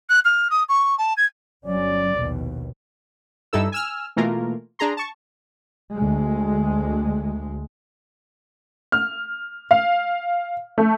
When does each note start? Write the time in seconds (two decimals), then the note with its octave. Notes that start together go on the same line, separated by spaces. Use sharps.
0.10 F#6
0.25 F6
0.50 D#6
0.69 C#6
0.98 A5
1.17 G#6
1.66 G1 F#3 C#4 D5
2.15 A#1 D#2 B2
3.53 G2 G3 D#4 E4 A4 E6
3.72 G#5 E6 F6
4.16 B2 E3 A3 A#3 F4 A#4
4.79 D4 G#4 A#5 C6
4.97 A5 C#6
5.95 D2 G#3
8.92 F6
9.71 F5
10.78 A3